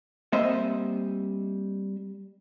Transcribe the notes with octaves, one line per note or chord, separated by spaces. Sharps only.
G3 A#3 C4 C5 D#5 E5